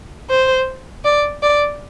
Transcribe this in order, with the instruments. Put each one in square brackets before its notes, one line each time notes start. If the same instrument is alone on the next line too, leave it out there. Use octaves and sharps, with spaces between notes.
[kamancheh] C5
D5
D5